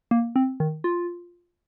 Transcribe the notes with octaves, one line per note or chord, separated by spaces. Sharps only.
A#3
C4
D#3
F4